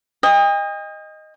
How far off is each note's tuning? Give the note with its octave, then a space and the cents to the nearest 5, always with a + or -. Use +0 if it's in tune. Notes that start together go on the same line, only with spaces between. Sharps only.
D#5 +0 G5 +45 D#6 +5